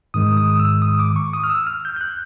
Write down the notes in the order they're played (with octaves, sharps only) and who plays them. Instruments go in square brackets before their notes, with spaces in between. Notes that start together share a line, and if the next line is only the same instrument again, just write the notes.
[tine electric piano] G#2 D#3 G#3 D#6
D#6
E6
D#6
D6
C#6
D#6
F6
E6
F6
G6
G6
F#6